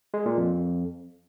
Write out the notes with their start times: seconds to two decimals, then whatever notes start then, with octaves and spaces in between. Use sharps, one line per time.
0.14 G#3
0.26 A#2
0.37 F2